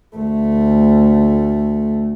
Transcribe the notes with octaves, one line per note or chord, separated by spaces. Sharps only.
D2 A3